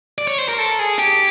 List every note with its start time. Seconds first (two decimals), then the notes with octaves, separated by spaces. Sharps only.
0.18 D5
0.28 C#5
0.38 C5
0.48 A#4
0.58 A4
0.79 G#4
0.99 G4